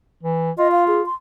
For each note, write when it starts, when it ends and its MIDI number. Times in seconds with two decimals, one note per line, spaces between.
0.23 0.51 52
0.58 1.04 65
0.58 0.70 75
0.72 0.84 77
0.88 1.04 68
1.06 1.14 84